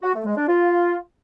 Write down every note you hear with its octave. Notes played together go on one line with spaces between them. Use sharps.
F#4
A3
G#3
D4
F4